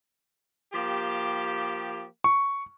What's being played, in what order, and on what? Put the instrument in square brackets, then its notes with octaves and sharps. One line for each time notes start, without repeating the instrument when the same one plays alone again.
[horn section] F3 A#3 G4
[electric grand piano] C#6